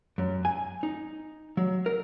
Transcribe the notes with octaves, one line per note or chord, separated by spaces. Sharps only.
F#2
G#5
D#4
F#3
A#4